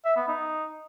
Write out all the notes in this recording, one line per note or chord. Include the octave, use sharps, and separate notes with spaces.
E5
B3
D#4